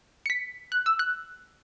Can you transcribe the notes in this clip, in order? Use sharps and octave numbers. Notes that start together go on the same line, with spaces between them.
C#7
B6
F#6
E6
F#6